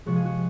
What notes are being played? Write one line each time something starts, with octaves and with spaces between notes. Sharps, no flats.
C3 F3 G#3 F#4
G#4
F#4